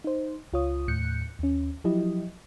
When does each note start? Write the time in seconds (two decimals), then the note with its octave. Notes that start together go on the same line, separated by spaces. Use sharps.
0.04 D#4 C5
0.53 C#2 F4 C#5 D#6
0.88 D#2 A2 F#6 G6 C#7
1.39 D#2 C#4
1.84 F3 F#3 E4 G4 D#5